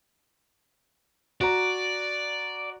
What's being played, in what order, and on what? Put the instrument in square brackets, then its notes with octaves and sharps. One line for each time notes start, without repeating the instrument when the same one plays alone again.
[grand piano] F#4 A#5 [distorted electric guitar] D5